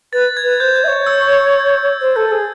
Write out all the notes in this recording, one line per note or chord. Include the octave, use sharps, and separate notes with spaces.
B4 A6
G#6
B4
C5 G6
G6
E5
C#5
E6
C5
A4
G#4